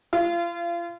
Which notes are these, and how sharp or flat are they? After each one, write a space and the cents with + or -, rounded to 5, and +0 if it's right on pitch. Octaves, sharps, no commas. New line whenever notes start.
F4 -35